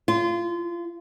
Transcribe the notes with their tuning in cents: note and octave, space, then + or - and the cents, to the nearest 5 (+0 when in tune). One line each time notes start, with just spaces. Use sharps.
F4 -25